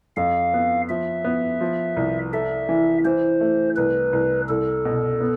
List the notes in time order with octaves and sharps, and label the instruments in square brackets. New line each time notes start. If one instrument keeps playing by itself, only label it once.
[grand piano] F2 [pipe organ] F5
[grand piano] B3
[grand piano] F3 [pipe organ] E5
[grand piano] B3
F3
C2
[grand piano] A4 [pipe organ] E5
[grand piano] E3
[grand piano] E3 [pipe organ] C5
[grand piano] A3
[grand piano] C2 [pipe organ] B4
[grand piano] C2
[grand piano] C2 [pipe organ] A4
[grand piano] B2
B3